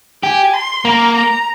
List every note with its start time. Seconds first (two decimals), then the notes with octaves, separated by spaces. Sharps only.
0.23 G4 G#5
0.54 C6
0.85 A#3 A#5
1.14 A#5